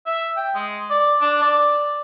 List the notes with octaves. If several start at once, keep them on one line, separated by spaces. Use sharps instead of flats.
E5
G5
G#3
D5
D4
D5